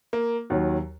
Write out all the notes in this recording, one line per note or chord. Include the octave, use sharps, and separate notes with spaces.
A#3
D#2 D#3 F#3